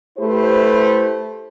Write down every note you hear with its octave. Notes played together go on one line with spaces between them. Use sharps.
A3 E4 G4 B4 C5